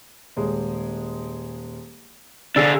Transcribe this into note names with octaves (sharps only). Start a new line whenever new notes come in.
D#1 G#3
D3 D4 G#4 E6